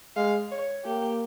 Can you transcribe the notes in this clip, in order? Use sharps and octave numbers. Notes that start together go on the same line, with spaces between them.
G#3 F5
C#5
A#3 G4